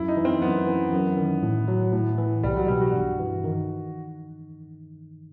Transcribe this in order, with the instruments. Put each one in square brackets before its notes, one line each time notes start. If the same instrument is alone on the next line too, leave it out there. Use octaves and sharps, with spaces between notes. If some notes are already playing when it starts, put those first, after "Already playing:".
Already playing: [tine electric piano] F#2 [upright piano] E4
[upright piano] D#4
[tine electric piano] E3
[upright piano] C4
[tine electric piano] F#2 [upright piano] B3
[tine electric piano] E3
F#2
D#3
A2
F#3
A2
E3
[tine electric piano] C2 [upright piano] G3
[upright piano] F#3
[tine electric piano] B2 [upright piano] G3
[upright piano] F#4
[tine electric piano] G2
E3
D#3